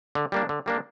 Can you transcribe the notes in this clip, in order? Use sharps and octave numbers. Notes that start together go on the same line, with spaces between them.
D3
G3 A#3 D4
D3
G3 A#3 D4